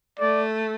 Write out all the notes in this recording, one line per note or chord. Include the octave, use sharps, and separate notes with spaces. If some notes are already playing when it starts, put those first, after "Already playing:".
A3 D5